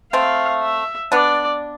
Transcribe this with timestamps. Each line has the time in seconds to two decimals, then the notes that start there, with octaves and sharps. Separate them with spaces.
0.13 A3 C4 F5
0.62 E5
1.12 B3 D4 D5